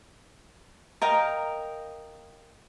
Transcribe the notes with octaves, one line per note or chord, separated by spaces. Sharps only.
A#4 D#5 F5 G5